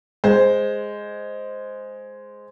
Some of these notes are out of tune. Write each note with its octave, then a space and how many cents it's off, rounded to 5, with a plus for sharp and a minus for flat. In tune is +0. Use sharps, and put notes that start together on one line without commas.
G#3 +0 C5 +0